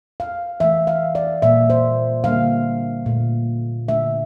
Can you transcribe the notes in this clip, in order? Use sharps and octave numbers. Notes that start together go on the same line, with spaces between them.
F5
E3 A3 E5
F5
D5
A#2 G3 A#3 E5
C5
D3 G3 A#3 F5
A#2 A3
D3 A3 E5